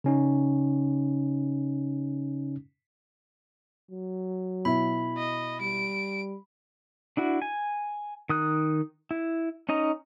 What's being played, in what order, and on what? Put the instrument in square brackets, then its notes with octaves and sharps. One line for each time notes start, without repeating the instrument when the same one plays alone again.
[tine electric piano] C#3 C#4 D#4
[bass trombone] F#3
[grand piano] B2 E4 [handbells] B5
[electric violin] D#5
[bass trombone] G3 [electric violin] D7
[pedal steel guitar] D4 E4 F#4
G#5
D#3 D#6 F#6
E4
C#4 D#4 D#5 A#5